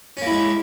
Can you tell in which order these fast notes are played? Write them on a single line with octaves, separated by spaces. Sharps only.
C#4 A#3 E4 G#3